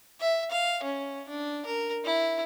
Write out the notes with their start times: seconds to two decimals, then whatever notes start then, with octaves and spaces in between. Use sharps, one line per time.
0.21 E5
0.51 F5
0.83 C#4
1.29 D4
1.66 A#4
2.04 E4